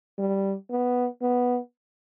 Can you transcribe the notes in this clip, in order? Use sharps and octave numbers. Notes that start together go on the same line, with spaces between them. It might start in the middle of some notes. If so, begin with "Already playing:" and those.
G3
B3
B3